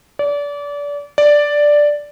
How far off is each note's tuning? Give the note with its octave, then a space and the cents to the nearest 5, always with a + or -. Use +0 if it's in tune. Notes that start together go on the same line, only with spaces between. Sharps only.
D5 -30
D5 +0